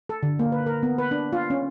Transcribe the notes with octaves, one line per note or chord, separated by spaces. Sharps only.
A4
D3
A#3
B4
A#4
B3
B4
D4
F4
C#4